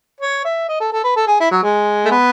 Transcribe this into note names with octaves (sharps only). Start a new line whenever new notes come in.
C#5
E5
D#5
A4
A4
B4
A4
G#4
E4
F#3
G#3
A3
B3